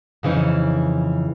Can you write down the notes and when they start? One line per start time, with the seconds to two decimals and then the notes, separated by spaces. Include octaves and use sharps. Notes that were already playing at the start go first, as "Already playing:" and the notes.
0.23 F2 C#3 E3 D#4